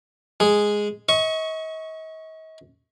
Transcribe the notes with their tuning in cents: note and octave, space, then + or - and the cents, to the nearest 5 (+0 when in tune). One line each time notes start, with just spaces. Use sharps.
G#3 +0 G#4 +0
D#5 +40 C#6 +0